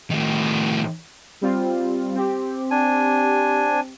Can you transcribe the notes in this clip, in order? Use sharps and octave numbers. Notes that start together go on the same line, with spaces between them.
A2 D#3
G3 C4 F4
C4 G4
D4 G#5